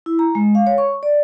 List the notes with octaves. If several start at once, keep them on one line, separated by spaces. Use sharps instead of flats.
E4
A#5
G#3
F5
C#5
C#6
D5